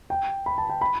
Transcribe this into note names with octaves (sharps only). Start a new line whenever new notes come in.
G5
B5
A5
G5
B5